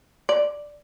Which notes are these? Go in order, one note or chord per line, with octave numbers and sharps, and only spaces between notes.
D5